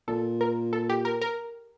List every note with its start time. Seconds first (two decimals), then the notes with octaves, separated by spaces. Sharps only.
0.08 A#2 A4
0.41 A#4
0.73 A4
0.90 G4
1.05 A#4
1.21 A#4